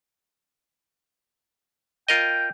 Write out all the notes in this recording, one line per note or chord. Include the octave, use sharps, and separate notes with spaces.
F4 A#4 D#5 G5